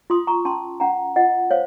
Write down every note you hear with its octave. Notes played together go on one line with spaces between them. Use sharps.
F4 C6 D#6
A#5 C#6
C#4 A5 C6
C#4 F#5 A#5
F4 D#5 F#5
C5 C#5 F5